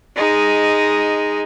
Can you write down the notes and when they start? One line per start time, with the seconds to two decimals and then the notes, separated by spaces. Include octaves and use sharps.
0.16 G#3 D#4